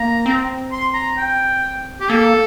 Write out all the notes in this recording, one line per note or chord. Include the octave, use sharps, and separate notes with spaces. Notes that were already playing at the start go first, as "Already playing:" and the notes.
Already playing: A#3 A#5
C4
C6
A#5
G5
G4
A#3 A4